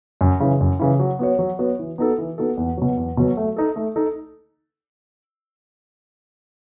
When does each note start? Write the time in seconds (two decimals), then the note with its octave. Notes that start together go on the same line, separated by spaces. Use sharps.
0.21 F#2
0.40 C#3 E3
0.61 F#2
0.79 C#3 E3
0.99 F#3
1.19 B3 F#4 C#5
1.39 F#3
1.59 B3 F#4 C#5
1.79 E3
1.98 B3 D#4 F#4 A4
2.18 E3
2.38 B3 D#4 F#4 A4
2.57 E2
2.77 B2 F#3
2.97 E2
3.17 B2 F#3
3.37 A3
3.56 D#4 A4
3.76 A3
3.96 D#4 A4